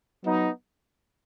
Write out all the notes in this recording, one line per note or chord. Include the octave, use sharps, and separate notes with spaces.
F#3 B3 D#4